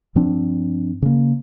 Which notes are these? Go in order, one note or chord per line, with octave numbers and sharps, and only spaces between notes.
G2 F3 C4 D4
C#3 A#3